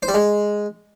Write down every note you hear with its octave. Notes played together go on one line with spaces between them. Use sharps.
C5
G3
G#3